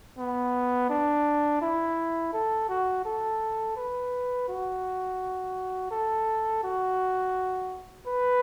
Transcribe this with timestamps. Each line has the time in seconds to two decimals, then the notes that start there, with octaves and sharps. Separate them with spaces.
0.18 B3
0.90 D4
1.61 E4
2.33 A4
2.69 F#4
3.05 A4
3.76 B4
4.48 F#4
5.91 A4
6.63 F#4
8.06 B4